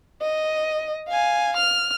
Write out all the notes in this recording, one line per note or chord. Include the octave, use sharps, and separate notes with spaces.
D#5
F5 G#5
F6